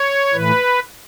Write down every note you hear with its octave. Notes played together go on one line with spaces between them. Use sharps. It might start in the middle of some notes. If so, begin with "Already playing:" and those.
Already playing: C#5
A2 E3 B4